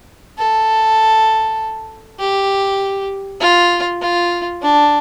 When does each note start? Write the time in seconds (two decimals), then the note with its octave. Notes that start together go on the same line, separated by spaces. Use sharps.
0.38 A4
2.19 G4
3.40 F4
4.01 F4
4.62 D4